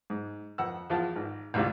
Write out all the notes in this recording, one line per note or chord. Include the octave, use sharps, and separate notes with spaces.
G#2
F2 F#5 E6
E2 F3 F4 A5
G#1
A1 D2 G#2 C3 F4